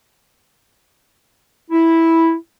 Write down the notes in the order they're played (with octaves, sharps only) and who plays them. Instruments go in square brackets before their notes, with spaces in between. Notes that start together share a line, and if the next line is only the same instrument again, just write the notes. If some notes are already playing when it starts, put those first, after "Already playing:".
[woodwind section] E4